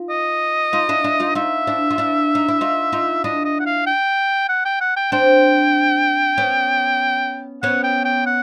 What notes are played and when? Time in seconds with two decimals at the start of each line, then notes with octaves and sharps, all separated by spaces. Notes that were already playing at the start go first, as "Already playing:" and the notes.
Already playing: D#4 F4
0.10 D#5
0.73 D#4 F4
0.89 D4 E4
1.04 D4 E4
1.20 D#4 F4
1.35 D#4 F4 E5
1.67 D4 E4
1.91 F4
1.98 D4 E4
2.35 D#4
2.48 E4
2.61 D#4 F4
2.93 D#4 F4
3.24 D4 E4 D#5
3.45 D#5
3.60 F#5
3.66 F5
3.86 G5
4.49 F#5
4.65 G5
4.81 F#5
4.96 G5
5.12 C4 D4 G5
6.38 B3 C#4
7.62 B3 C#4 F#5
7.84 G5
8.05 G5
8.26 F#5